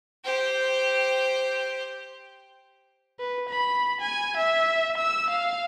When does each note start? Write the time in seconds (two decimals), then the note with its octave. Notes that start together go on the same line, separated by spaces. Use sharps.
0.24 G4 C5
3.20 B4
3.49 B5
4.01 G#5
4.37 E5
4.97 E6
5.30 F5